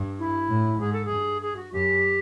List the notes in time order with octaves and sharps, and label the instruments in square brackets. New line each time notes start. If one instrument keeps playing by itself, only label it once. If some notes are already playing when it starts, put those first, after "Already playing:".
Already playing: [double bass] G2
[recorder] E4
[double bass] A2
[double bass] G#2 [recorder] G#4
[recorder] A4
G#4
[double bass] G2
[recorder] G#4
F#4
[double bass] F#2 [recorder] G4